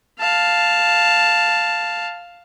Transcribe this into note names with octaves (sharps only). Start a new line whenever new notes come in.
F5 A5